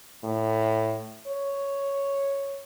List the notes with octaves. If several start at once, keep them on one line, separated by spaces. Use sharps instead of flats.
A2
C#5